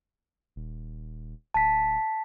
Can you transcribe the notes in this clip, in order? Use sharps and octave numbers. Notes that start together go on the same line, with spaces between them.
D#1
D1 A5 B6